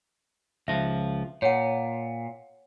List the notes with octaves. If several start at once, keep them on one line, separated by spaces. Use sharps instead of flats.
C#2 F3 E5
A#2 C#5 F#5